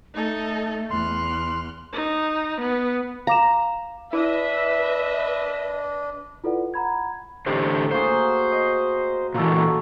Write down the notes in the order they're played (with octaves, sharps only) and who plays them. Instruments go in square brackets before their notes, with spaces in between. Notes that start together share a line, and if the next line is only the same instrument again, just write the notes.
[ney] A3 [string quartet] D#4 A4 D#5
[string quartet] E2 F6 F#6 [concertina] C6
[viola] D#4
B3
[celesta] F5 D6 E7 [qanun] A#5
[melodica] D4 [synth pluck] E4 [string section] B4 D#5 [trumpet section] E5
[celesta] E4 F4 A4 B4 D5 F#5
F#5 A#5 B5 G#6
[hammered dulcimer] A2 D5 [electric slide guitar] D3 G4 C5
[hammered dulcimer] A#3 F#4 G#4 [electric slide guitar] C5
[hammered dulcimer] D#5
[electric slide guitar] A#2 E3 [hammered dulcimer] F#3 A#3 A4